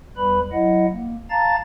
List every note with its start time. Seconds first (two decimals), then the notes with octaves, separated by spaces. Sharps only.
0.17 E2 G3 B4 B5
0.52 F#3 E4 D#5 F#5
0.92 A#3
1.30 F5 A5 A#5 A6